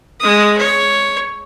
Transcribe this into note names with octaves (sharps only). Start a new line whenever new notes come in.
G#3 D#6
C#5